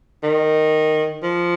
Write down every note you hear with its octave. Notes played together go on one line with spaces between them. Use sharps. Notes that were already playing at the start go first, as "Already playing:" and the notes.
D#3
F3